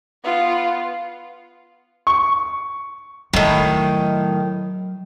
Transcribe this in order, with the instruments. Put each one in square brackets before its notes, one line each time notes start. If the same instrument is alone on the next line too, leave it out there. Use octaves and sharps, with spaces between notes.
[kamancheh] B3 F4
[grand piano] C#6
[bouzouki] A2 D#3 [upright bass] F#3